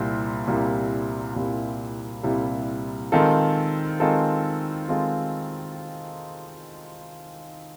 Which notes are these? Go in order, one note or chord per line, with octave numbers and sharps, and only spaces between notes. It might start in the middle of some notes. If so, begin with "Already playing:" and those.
Already playing: C2 A#2 G3 C4 E4
C2 A#2 G3 C4 E4
C2 A#2 G3 C4 E4
C2 A#2 G3 C4 E4
D#3 G#3 C4 F4 A4
D#3 G#3 C4 F4 A4
D#3 G#3 C4 F4 A4